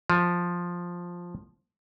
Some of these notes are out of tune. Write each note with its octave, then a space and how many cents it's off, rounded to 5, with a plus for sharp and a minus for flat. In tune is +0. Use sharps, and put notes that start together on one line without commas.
F3 +5